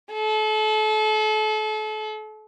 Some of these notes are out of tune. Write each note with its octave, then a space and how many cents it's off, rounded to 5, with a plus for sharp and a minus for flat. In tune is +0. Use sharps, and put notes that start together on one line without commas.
A4 -35